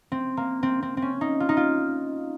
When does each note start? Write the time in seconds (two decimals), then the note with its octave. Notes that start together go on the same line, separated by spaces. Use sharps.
0.12 C4
0.37 A#3
0.63 C4
0.82 C4
0.97 C4
1.02 C#4
1.21 D#4
1.40 F4
1.49 D#4
1.57 F4